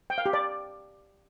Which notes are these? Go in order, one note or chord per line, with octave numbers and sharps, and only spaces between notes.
G5
F5
G4
D5